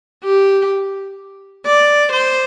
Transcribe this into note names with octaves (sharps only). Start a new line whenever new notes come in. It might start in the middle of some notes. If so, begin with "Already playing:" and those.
G4
D5
C5